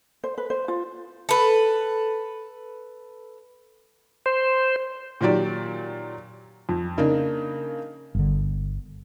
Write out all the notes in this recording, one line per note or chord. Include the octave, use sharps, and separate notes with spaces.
C5
B4
C5
F4
A4 B4
C5
A#2 D#3 F#3 G4 D5
F2
C#3 A#3 D4 D#4
G1 D3